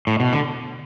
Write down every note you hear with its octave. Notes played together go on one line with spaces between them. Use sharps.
A2
B2
D3